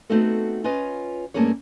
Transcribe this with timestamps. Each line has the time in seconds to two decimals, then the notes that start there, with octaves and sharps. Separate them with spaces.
0.10 A3 B3 C4 D#4 F#4 A4
0.64 C#4 F4 B4 C#5 D#5
1.34 G2 A3 A#3 C#4 G#4 C#5